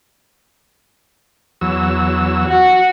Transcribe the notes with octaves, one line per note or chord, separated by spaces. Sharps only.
E2 F#3 E6
F#4